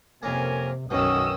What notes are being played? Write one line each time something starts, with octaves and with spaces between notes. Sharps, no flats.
F2 C3 A#3 C#4 A#4 G#5
B1 F#2 B2 D#3 C#4 F#4 D#6 E6